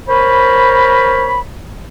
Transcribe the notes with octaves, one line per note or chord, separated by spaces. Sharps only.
A#4 C5 C#5 B5